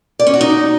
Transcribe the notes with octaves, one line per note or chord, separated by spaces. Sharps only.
D5
C#4
F#4
D#4